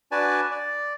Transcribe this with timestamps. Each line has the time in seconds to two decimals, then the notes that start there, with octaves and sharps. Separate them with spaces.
0.12 D4 F#4 B4 D5 G#5 A5
0.51 D5